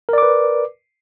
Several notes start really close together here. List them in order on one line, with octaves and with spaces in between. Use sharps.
A#4 D5 D6 B4